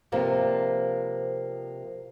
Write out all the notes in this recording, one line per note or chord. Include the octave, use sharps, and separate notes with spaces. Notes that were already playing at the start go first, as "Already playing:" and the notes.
C3 F3 A#3 B3 D5